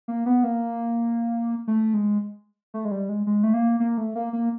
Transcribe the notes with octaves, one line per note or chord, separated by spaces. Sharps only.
A#3
B3
A#3
A3
G#3
A3
G#3
G3
G#3
G#3
A3
A#3
A#3
A3
A#3
A#3